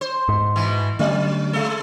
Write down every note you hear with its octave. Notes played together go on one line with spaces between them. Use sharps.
C5
G#2
B2 E3
D3 F#3 A3 C#4
G#3 A4